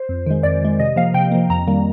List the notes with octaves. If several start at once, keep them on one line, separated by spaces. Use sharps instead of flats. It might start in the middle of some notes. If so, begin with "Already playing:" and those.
Already playing: C5
F2
D#3 G#3
F2 D5
D#3 G#3
C3 D#5
F3 A#3 F5
C3 G5
F3 A#3
F2 A#5
D#3 G3 A#3